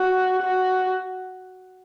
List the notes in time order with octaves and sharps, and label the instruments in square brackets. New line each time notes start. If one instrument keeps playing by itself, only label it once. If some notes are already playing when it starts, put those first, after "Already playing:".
Already playing: [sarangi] F#4
F#4